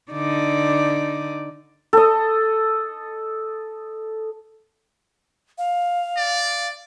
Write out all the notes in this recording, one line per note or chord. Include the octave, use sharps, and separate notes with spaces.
D3 D#4 D5
A4 D#5
F5
D5